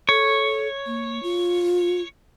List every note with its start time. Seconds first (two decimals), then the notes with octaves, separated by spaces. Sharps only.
0.09 A4 C#5
0.86 A#3
1.23 F4